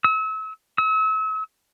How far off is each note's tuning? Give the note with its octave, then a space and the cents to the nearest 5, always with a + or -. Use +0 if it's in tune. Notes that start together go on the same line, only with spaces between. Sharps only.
E6 -35
E6 -40